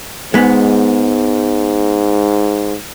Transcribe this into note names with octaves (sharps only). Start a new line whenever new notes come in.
G#2 G#3 B3